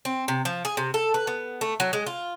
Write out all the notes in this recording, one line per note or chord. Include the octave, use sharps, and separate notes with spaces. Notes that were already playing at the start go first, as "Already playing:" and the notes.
C4
C3
F3
G#4
C3
A4
B4
B3
A3
F#3
G#3
F4